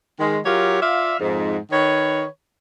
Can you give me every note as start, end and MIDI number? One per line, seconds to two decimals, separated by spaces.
0.20 0.40 51
0.20 0.40 56
0.45 0.82 54
0.45 0.82 65
0.45 0.82 67
0.45 0.82 70
0.45 0.82 73
0.82 1.16 65
0.82 1.16 74
0.82 1.16 76
0.82 1.16 77
1.20 1.58 41
1.20 1.58 44
1.72 2.26 51
1.72 2.26 71
1.72 2.26 73